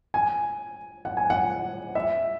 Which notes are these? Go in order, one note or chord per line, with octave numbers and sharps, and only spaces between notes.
G#5
F#5
G#5
F#5
E5